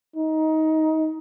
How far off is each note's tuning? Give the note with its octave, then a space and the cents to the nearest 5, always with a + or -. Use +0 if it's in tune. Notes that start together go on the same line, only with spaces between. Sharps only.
D#4 +20